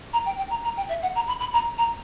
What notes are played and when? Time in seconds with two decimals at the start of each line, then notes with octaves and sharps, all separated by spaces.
0.13 A#5
0.26 G5
0.38 G5
0.50 A#5
0.64 A#5
0.77 G5
0.89 E5
1.02 F#5
1.15 A#5
1.28 B5
1.40 B5
1.53 A#5
1.78 A#5